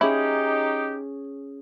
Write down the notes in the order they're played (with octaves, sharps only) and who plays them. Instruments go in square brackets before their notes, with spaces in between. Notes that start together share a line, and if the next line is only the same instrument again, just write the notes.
[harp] C#4 G#4 [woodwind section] D#4 G4 [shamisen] E4